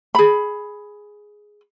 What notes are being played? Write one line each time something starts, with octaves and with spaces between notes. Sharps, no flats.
G#4 B5